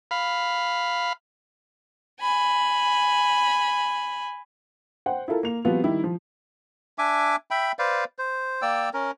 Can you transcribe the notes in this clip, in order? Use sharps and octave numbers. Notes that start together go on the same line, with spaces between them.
F5 B5
G#5 B5
C5 F#5 G5
E4 F4 A4 A#4
A#3 F7
F3 G3 B3 C4 F4 F#4
D#3 G3 E4 G4
F3
D4 E5 G#5 D6
E5 G5 B5
B4 C5 D5 F5
C5
A#3 D5 G5 E6
C#4 A#4